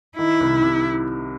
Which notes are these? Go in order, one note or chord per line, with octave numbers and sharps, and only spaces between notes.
D#3 E4
C2
C3